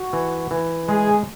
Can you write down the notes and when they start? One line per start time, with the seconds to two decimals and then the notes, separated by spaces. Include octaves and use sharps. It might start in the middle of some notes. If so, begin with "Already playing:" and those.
Already playing: F#4
0.13 E3
0.51 E3
0.88 G#3 G#4